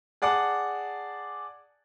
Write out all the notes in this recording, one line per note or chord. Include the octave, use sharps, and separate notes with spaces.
G#4 D5 F#5 A5 D6